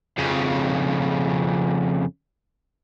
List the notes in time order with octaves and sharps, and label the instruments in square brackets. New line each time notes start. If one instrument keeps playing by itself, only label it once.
[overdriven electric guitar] F2 C#3